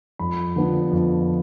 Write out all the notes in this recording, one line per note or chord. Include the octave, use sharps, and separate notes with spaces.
F2 B5
D3 F3 B3 D4
F2